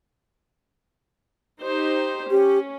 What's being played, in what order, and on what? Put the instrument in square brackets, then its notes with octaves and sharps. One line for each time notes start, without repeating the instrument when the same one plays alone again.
[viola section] D#4 G4 C5
[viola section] C#4 [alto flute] G4